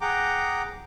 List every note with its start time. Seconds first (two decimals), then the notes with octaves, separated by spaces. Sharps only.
0.01 G#4 F#5 G5 A#5 D6